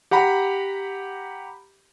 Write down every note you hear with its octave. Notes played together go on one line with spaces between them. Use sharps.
G4 F#5 A#5 B5